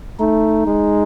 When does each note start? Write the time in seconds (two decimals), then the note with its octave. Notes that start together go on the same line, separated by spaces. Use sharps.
0.20 A3 D#4
0.67 G#3